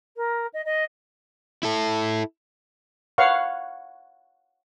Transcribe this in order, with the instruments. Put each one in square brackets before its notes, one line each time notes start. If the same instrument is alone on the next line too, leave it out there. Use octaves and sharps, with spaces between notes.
[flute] A#4
D#5
D#5
[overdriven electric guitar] E4 A4
[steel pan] B4 C#5 F5 F#5 C#6